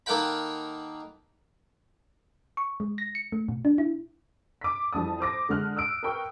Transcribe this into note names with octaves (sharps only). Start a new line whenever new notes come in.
D#3 A#3 A4 F#5 G5 B5
C#6
G#3
A#6
C#7
A3
B2
D4
E4
D6 B6
F2 E3 G3 A5 D#6
C5 D6 A#6
D3 G#3 F6 F#6
D#6 E6 F#6 D7
A#4 B4 G5 C#6